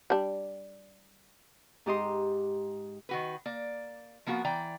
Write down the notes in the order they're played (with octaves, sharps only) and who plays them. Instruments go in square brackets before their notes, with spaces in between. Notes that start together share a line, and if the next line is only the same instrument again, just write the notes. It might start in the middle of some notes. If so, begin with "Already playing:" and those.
[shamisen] G3 D4
[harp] G#2 G4 D#5 C6
[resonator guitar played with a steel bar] D#3 F#4 B4
A#3 D5
F3 A#3 B3 F#4
E3 D5 G5 A#5